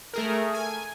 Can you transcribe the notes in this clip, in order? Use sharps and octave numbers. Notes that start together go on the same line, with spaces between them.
A3 G#4 A#4
G#5